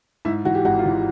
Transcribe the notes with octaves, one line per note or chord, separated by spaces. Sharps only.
G#2 E4
E3 F#4
G4
G#1 F#4
F4
E3